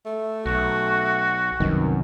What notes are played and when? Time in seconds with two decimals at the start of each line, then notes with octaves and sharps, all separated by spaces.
0.06 A3
0.46 B1 F#4
1.60 C2 F#2 B2 D#3